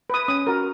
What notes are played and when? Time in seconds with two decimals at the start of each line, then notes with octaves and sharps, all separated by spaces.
0.10 B4 D#6
0.28 C#4 D#6
0.47 F#4 A#4